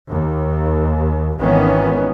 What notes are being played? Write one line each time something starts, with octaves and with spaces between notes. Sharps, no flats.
D#2
G#1 D#3 E3 B3 C#4